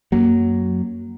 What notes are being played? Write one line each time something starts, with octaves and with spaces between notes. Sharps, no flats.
F#2 F#3 A#3